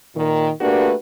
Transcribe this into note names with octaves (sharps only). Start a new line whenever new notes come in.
A#2 D#3
A3 A#3 D4 F#4 G4 B4